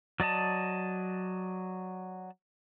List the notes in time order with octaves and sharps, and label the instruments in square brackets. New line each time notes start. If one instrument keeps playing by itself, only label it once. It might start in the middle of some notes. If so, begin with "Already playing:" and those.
[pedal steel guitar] F#3 D5 D#5 A5